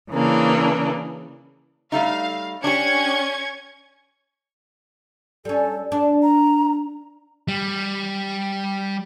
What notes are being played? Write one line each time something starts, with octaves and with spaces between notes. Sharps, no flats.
C#3 E3 A#3 D4
G3 A3 D#4 F5
C#4 D4 G4 C#6 G#6
G3 C#4 A4
D4 A5
A#5
G3